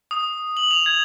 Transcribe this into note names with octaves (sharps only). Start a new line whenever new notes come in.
D#6
F#7
F7
G#6